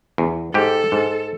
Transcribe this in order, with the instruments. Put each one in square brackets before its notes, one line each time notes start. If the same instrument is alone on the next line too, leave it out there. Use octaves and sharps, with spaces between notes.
[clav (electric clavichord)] E2
[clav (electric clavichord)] G#2 G4 [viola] A4
[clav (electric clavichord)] G#2